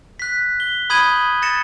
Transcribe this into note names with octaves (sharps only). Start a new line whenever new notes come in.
F#6 B6
G7
B5 D#6 G6 G#6 D#7 F#7
A6 A#6 C#7 E7